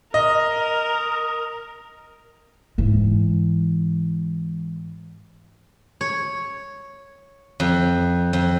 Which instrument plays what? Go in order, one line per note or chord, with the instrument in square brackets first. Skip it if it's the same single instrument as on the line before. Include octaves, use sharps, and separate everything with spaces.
[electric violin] A#4 [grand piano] D#5
[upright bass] G#2 E3
[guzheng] C#5
F2
F2